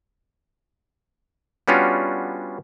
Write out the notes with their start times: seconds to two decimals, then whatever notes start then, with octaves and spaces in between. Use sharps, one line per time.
1.68 G3 B3 C#4 D4 F4 F#4